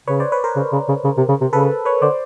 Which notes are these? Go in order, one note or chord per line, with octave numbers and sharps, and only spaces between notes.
C#3 B4 C#5
C5 D5
B4 C#5
A#4 C5
C#3
C#3
C#3
C#3
C3
C#3
C3
C#3 A4 B4
B4 C#5
D3 C5 D5